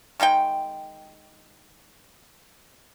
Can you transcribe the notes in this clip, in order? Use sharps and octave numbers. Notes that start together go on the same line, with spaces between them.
D#3 G#3 D#4 G5